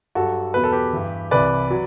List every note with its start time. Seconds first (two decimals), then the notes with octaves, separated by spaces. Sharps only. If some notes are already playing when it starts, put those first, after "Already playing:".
0.15 G2 F#3 F#4 A4
0.54 E2 B2 F#3 B4
0.64 A4
0.72 G4 B4
0.93 G2 E3
1.31 C2 C3 E3 B4 D5
1.70 F#3